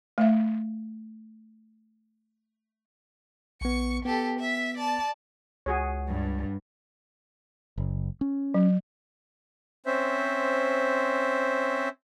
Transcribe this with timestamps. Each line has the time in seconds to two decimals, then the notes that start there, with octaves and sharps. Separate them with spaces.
0.18 A3 E5
3.61 A#1 B3 C#6 C#7
4.05 B3 G4 A4
4.39 E5 B6
4.77 D5 A5
5.66 C#2 F#4 G#4 C#5
6.07 G2
7.78 F#1
8.21 C#4
8.54 F#3
9.86 C4 C#4 C5 E5